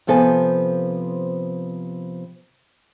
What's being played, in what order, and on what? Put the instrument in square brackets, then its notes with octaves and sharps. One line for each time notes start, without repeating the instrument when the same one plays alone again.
[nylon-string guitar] C3 F3 B3 A4 C5 G#5